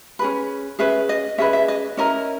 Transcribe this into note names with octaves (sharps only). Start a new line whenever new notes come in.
C#4 G#4 B4
C#4 G#4 B4 E5
D#5
C#4 G#4 B4 E5
E5
D#5
C#4 E4 A#4 D#5